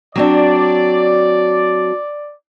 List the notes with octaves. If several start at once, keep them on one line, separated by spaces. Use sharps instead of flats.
F#3 C4 D4 D5